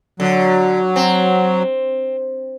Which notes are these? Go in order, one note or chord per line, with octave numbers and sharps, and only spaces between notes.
D3 F#3
C4